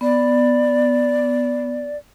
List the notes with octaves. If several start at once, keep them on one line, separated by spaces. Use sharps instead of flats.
B3 D5